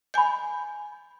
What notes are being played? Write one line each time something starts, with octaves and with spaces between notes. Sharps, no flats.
D#5 G#5 B5 G6